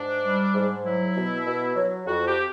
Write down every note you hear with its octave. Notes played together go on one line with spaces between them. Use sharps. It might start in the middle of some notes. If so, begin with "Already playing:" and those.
Already playing: G#2 D4
G3
G#2
F#3 E4
B2
B2
F#3
F2 F#4
G4